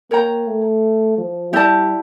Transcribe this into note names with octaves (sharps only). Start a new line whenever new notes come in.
A#3 A#4 C#5 G5 A#5
A3
F3
G3 E4 G4 D5 A5